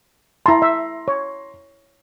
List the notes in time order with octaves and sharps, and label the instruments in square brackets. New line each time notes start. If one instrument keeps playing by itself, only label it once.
[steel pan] E4 A5 [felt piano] A#5 C6
[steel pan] E5
C#5